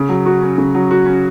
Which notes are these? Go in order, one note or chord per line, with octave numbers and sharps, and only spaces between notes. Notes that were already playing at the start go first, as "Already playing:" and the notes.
Already playing: C#3
F#3
F#4
C#4
C#3
F#3
F#4
C#4